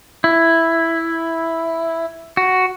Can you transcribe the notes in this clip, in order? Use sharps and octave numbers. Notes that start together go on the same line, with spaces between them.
E4
F#4